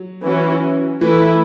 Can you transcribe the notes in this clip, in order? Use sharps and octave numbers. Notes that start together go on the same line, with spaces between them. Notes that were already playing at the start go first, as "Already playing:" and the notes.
Already playing: F#3
E3 C#4 F#4
E3 A3 E4 B4